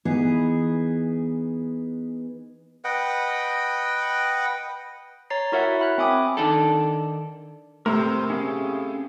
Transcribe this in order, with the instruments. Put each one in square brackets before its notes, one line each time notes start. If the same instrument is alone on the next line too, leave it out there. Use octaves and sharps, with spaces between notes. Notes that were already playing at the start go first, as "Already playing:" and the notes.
[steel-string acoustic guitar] E3 B3 D#4 G#4
[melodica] B4 D#5 F#5 G5
[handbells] C#5 A#5 A6 C7
E4 F#4 A#4 C#5 E5 F#5
E5 B5 F#6
C4 E5 G#5 D6 D#6
[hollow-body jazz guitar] D#3 D4 A4
[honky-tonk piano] A2 C3 [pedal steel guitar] A#4 C5 E6
[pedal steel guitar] C#4 G#4 F5